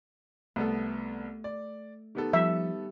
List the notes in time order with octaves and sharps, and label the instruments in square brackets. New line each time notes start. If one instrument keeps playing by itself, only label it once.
[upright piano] C2 B3 A4 [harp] A3 D#6
[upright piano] D5
[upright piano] D#3 B3 A4 [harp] G4
[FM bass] F3 [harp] G3 [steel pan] E5